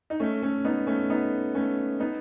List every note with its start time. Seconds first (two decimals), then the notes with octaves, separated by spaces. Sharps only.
0.10 D#4
0.20 A3 C#4
0.43 A3 C#4
0.64 B3 D#4
0.87 A3 C#4
1.10 B3 D#4
1.55 A3 C#4
2.00 B3 D#4